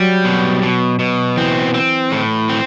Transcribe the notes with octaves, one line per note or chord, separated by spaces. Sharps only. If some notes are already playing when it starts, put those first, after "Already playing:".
Already playing: F#3 G3
B2
B2
B2
E3 C4
C4
A2
C4